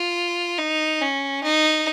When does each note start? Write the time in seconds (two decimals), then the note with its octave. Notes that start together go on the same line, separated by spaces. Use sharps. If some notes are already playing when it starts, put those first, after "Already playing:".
Already playing: F4
0.58 D#4
1.01 C#4
1.43 D#4